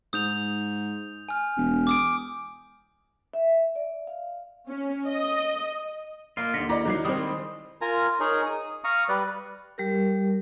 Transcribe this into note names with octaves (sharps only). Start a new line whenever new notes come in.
G#2 D#6 G6 F7
G#5 F6
E1
D6 D#6 D7
E5
D5
F5
C#4
D#5
A#3 F4 D#5
D#2 D3 A#6 B6 C#7
E4 D5 D#5 A#5 D6 A#6
D#3 F#3 D#4 E4 C7
D#3 G3 G#3 C4 D#6
F4 A#4 G#5 A#5
D#4 G#4 A#4 C#5
D#6
F5 A#5 C#6 D#6
G3 B4 D5
G3 G4 A#4